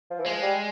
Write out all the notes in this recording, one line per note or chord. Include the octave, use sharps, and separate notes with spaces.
F3
E3
F3 G#3
G3